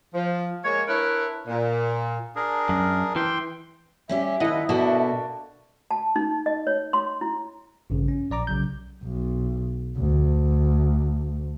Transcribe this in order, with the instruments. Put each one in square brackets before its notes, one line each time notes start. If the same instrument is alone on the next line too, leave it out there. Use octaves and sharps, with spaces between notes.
[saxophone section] F3
G#3 A#3 C#5
D4 E4 A#4 B4 C#5
A#2
[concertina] D4 G#4 A#4
[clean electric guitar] F#2
[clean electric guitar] E3 [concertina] G5 C6
[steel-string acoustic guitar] G3 C#4 G4 [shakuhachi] E5
[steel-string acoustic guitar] D#2 F4 [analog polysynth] E4 D#5 F#5
[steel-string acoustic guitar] B2 A4 [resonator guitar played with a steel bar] A#3 D4 F#4
[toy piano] A5
D#4
D#5
C#5
C6
E4
[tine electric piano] A1 G2 C#3
C#4
A#1 D5 A#5 D6
B1 C#3 F#3 G6
[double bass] B1
D2